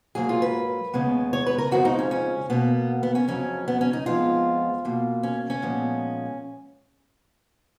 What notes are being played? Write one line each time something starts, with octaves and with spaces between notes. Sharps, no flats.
G#2 F#3 A#3 G#4
F4
B4
D#2 C#3 G#3 B3
C#5
B4
A#4
F2 C#3 F3 G#3 B3 F#4
D#4
C#4
C#4
B2 A#3 B3
B3
C#4
F2 C#3 F#3 C#4
B3
C#4
D#4
F2 F3 G#3 B3 F4
B2 A#3
C#4
C#4
A#2 F3 G#3 B3